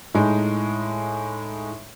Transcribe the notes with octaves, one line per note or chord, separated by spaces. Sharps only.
A2 G#3 D#4